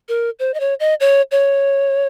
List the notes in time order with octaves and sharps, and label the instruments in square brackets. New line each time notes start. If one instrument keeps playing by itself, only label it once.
[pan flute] A#4
C5
D#5
C#5
D#5
C#5
C#5